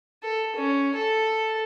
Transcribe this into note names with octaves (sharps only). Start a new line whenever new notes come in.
A4
C#4
A4